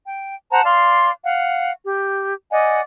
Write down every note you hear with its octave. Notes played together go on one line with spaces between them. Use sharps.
G5
C5 F#5 A5 A#5
D5 F5 C6
F5 F#5
G4
D5 D#5 F#5 G#5